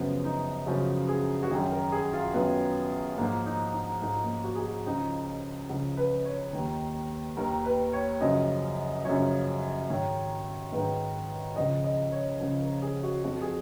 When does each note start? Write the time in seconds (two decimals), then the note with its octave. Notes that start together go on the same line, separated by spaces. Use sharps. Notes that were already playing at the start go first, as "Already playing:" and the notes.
Already playing: F#2 C#3 F3 B3
0.25 D#4
0.67 F#2 C#3 F3 F#4
1.08 G#4
1.43 F#4
1.50 D#3 G#4
1.55 F#2
1.71 A#4
1.92 G#4
2.13 F4
2.34 F#2 D#3 B3
3.18 G#2 F3 A#3
3.46 D#4
3.74 D#4
4.02 G#2 F3 D#4
4.23 A#3
4.44 F#4
4.55 G#4
4.65 F#4
4.86 C#2 C#3 F3 D#4
5.69 C#2 C#3 F3
5.97 B4
6.25 C#5
6.53 D#2 D#3
7.37 D#2 D#3 A#4
7.65 B4
7.93 C#5
8.21 F#2 C#3 F3 D#5
9.05 F#2 C#3 F3 C#5
9.89 G#2 D#3 C#5
10.72 G#2 D#3 B4
11.56 C#2 C#3 F3 D#5
11.84 D#5
12.12 C#5
12.40 C#2 C#3 F3
12.61 A#4
12.82 G#4
13.03 F#4
13.24 F2 F3 F#4
13.42 G#4